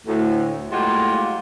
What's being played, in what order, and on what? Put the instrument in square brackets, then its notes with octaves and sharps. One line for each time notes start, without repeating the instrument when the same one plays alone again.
[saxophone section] D2 A2
A2 F#3 G#3 A#3 F4 G4